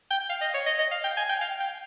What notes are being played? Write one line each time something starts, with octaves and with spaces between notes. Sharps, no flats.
G5
F5
D#5
C#5
D#5
D#5
F5
G5
G#5
G5
F5
G5